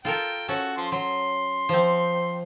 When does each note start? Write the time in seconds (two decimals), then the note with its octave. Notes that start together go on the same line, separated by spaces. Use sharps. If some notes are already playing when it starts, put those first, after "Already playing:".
0.05 F4 A4 A#4 G5
0.48 C#4 F#4 A4
0.77 F3 C6
0.92 F#3 C6
1.69 F3 C4